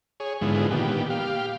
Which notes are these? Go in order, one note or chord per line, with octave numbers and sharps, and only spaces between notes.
G#4 C#5
G#2 D3 F3 G#3 B3 E4
A#2 D#3 B3 G4
G4 F5